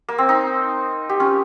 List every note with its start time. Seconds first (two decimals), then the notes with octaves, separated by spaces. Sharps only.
0.09 A#3
0.18 C4
0.29 D#4
1.09 G4
1.20 C#4 F4